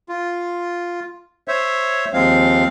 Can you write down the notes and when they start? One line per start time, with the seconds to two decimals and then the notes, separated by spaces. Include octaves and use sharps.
0.09 F4
1.48 C5 C#5 E5
2.13 D#2 F3 G#3 C4 F5